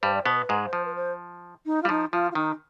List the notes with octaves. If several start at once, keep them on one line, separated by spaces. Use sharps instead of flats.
G2 G3 C5
D5
B2 B3 C5
B4
G#2 G#3
C5
F3
B4
C5
D#4
F4
G3
F3 D#4
F3 F4
F4
D#3 D#4